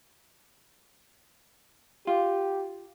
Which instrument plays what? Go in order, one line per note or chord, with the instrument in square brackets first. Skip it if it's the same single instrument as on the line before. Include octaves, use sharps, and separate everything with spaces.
[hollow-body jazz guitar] F4 [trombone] G4